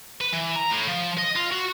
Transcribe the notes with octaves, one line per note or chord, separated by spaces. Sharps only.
B4
E3
A#5
A2
F3
D#5
F4
F#4